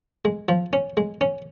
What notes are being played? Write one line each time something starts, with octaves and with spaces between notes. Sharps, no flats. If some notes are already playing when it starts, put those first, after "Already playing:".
G#3
F3
C#4
G#3
C#4